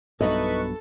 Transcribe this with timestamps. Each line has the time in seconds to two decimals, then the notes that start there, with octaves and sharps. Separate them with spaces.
0.21 B1 G2 B2 D#4 A4 B4 D#5 C#6